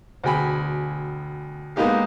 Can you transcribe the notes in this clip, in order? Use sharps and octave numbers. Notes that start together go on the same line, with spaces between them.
D2 B2 G#4 G5 G#5 B5
G#3 A#3 B3 D#4 G4 F5